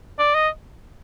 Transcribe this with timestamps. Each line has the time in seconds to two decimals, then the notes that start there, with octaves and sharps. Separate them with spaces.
0.19 D5
0.34 D#5